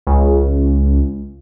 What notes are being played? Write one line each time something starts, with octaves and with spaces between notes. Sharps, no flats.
C#2